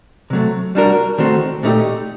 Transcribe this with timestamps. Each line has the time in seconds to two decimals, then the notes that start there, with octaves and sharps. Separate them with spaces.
0.30 C3 F#3 A3
0.75 G3 D4 F#4 A#4
1.18 D#3 A3 C4 F#4 C5
1.63 A#2 A3 D#4 G4